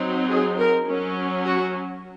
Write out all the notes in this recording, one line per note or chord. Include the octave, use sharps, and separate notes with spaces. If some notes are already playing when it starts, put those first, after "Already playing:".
Already playing: F#3 C4 D#4
G#4
A#4
F#3 C#4
F#4